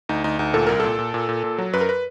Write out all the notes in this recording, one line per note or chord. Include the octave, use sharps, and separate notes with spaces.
D2 D#4
D2 D#4
D2 D#4
A#2 A4
C2 A#4
A#2 A4
A#2
A#2
A#2
A#2
F#3
F#2 B4
A#4
B4